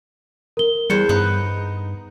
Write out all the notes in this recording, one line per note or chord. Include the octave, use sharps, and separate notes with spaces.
A#4 G7
E2 G3 C5 C#7
G2 B3 D#4